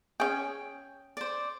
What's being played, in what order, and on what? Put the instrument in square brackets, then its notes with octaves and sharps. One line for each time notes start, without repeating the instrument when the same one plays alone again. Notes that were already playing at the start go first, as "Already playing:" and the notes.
[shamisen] C#4 G#4 [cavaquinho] G5 G#5
[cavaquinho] C5 D5